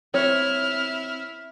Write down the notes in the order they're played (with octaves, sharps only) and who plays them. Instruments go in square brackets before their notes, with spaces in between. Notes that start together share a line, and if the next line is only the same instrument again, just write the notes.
[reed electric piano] C4 [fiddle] E4 [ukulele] C#5 [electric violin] F6